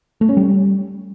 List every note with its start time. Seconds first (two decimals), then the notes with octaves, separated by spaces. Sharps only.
0.21 A3
0.29 C#4
0.37 G3